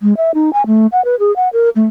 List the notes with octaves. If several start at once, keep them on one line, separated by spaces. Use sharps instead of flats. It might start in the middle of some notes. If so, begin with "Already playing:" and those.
G#3
E5
D#4
G#5
A3
F#5
B4
G#4
F#5
A#4
A3